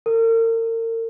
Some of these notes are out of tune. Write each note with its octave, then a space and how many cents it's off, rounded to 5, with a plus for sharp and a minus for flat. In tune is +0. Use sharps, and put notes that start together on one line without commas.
A#4 -40